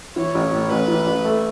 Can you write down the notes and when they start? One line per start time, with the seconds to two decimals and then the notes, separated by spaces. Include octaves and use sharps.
0.16 E3 C#5
0.34 A1
0.52 A2
0.70 A1 B4
0.88 E3
1.06 A1
1.25 A3